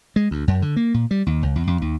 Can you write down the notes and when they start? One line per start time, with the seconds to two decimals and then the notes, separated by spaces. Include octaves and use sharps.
0.16 G#3
0.31 D2
0.48 F#2
0.62 D3
0.76 A#3
0.94 A#2
1.11 G3
1.26 D#2
1.43 C#2
1.56 E2
1.67 F2
1.82 D#2